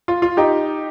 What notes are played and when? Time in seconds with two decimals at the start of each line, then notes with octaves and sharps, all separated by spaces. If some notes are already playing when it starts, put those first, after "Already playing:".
0.08 F4
0.22 F4
0.37 D#4 G4